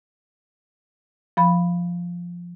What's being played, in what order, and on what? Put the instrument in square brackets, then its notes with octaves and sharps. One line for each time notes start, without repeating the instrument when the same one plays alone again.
[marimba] F3 B5